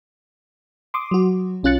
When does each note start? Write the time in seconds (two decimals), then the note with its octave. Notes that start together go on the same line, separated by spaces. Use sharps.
0.94 C6 D6 D#6
1.11 F#3 F#4
1.63 B1 C#4 F4 F#6 A6 C#7